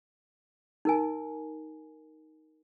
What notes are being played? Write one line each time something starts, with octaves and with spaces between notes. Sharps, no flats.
D#4 A#4 G#5